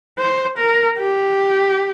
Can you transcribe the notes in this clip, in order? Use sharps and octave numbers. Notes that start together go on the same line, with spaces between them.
C5
A#4
G4